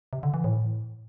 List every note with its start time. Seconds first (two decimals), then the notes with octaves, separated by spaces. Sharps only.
0.13 C3
0.23 D3
0.34 E3
0.44 A2